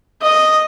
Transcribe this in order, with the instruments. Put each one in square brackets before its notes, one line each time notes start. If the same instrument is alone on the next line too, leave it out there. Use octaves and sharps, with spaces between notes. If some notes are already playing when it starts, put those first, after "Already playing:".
[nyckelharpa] D#5